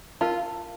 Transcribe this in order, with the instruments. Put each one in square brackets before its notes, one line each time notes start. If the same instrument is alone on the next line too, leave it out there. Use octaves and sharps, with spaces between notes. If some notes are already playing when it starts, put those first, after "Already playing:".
[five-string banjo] F4 [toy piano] A#4 F5 A5